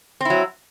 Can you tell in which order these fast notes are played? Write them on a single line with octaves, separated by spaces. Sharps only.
C4 E4 F#3